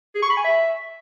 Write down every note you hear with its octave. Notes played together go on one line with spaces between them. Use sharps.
G#4
C#6
B5
G#5
E5